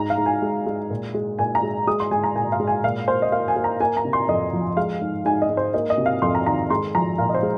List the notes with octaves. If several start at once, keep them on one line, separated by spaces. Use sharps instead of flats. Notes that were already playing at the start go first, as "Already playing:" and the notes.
Already playing: G#2 A#5
F5
G#2
G#5
G#3
G#3
A#2
G#3
A#2 G#5
A#5
G#3
G#3 D#6
C6
G#3 G#5
A#5
A#2 G#5
F5
G#3
G#5
A#2 F5
A#3 C5
D#5
A#3 F5
G#5
A#3
A#5
A#3 G#5
A#5
C3
C6
F2 D#5
F3
G#3 F5
G#2
G#2 G#5
D#5
G#2
C5
A#3 D#5
D#5
C3
F5
F2 C6
A#5
D#3 A#5
G#3 C6
F3 A#5
A#2 F5
D#5
C5
G#3